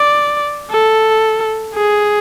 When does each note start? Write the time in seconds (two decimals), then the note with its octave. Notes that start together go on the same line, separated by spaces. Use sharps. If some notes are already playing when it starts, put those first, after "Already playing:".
Already playing: D5
0.71 A4
1.76 G#4